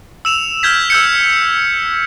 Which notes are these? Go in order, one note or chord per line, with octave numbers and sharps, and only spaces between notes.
E6 E7 F7
F6 G6 G#6 B6
E6 G6 C#7